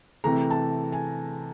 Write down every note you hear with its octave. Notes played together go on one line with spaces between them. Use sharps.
C3 E3 A3 A#5
A5
G#5